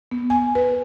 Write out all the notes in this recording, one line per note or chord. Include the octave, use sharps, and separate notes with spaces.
B3
G#5
B4